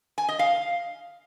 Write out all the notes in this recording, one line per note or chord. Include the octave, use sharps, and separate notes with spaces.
G#5
D#5
F5